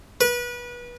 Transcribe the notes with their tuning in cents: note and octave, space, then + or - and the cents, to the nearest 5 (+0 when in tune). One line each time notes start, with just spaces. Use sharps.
B4 -30